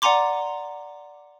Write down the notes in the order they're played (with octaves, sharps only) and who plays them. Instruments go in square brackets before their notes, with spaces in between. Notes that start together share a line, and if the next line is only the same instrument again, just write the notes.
[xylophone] D5 F#5 G#5 A#5 C6 D6